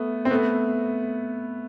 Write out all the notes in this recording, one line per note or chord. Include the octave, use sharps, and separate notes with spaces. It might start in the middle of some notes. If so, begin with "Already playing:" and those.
Already playing: A3 B3
C4
A3 B3